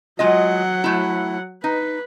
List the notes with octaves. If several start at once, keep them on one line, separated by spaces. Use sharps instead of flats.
F#3 G#3 F4 D#5 F#5
A3 E4
D#4 B4